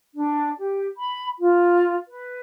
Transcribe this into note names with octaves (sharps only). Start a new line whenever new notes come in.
D4
G4
B5
F4
B4